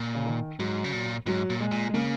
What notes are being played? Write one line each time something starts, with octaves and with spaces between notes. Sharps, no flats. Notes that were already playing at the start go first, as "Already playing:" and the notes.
Already playing: A#2
C#3
D#3
G#2 F#3
C#3
A#2
G#2 F#3
A#2
G#3
A#2
G#3
C#3 A#3